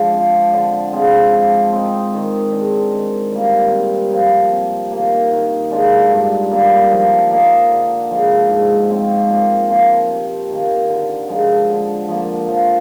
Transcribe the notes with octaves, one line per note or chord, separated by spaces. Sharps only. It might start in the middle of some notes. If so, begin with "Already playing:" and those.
Already playing: F3 G#3 D4
C4
F4
D3
G#3 C4 F4
F3
C4 D#4
D#3
G#3 D4
D#3
G3 A#3
C3
F3 A#3
C3
D#3 A#3
D#3
G#3 D4 F4
G2
D#3 G3 A#3
F3
A#3 D#4
D3
F3 G#3
G#2
F3 C4 F4
A#2
F3 A#3 F4
C3
D#3 A#3
D3
F3 G#3 D#4
D3
F3 A#3
F3